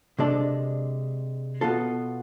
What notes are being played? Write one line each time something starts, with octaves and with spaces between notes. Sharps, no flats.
C3 G#3 D4 A4 D5
B2 B3 F4 A4